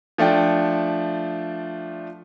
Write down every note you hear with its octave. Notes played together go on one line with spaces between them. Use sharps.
F3 A3 D4 G5